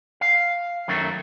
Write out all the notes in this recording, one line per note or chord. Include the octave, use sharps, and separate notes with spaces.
F5
F#2 D#3 F#3 A3